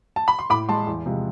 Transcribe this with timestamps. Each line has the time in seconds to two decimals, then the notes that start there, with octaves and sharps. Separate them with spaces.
0.16 A5
0.28 B5
0.39 C6
0.50 A2 B5 D6
0.69 G#3 A5 C6
0.87 E2
1.06 C3 F3 G#3